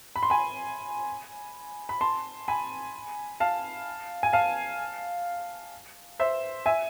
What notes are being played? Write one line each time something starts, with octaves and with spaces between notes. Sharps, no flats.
B5
C6
G#5 B5
B5
A5 C6
G#5 B5
F5 A5
G#5
F5 A5
C5 E5
E5 G#5